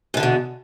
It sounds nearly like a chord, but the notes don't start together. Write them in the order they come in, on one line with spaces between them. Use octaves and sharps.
G#2 D3 E2 B2